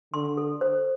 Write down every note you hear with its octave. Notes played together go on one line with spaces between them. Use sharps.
D3 C6
A4
C5